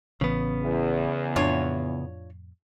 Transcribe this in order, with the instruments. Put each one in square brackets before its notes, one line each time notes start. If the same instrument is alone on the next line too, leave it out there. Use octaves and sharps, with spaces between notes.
[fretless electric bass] A1 E3 [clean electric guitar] C#3 B3
[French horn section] E2
[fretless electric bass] F2 A2 [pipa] D4 F4 C#5